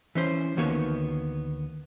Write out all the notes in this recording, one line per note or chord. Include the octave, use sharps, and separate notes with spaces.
E3 C#4 C5
D2 D#3 A#3 B3 C#5